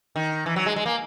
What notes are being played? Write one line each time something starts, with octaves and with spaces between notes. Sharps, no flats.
D#3
E3
F#3
G#3
G#3
A#3